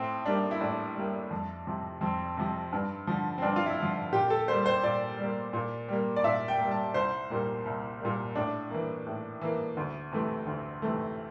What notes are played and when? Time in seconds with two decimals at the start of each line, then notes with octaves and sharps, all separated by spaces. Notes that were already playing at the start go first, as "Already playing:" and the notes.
Already playing: A2 C4
0.26 G3 A#3 D4
0.51 E4
0.61 A2 D4
0.96 G3 A#3
1.31 F2
1.67 C3 F3
2.01 F2 C4
2.37 C3 F3
2.73 G2
3.07 D3 F3
3.38 C4
3.42 G2 D4
3.56 F4
3.66 E4
3.78 D3 F3
4.12 A#2 G4
4.30 A4
4.48 G3 A#3 C5
4.66 C5
4.83 A#2 D5
5.18 G3 A#3
5.53 A#2
5.88 G3 A#3
6.16 D5
6.24 A#2 E5
6.48 G5
6.60 G3 A#3
6.71 A5
6.94 C2 C5
7.30 A#2 G3 A#3
7.66 C2
8.00 A#2 G3 A#3
8.35 A2 D4
8.70 E3 A#3
9.06 A2
9.41 E3 A#3
9.77 D2
10.12 C3 E3 A3
10.46 D2
10.82 C3 E3 A3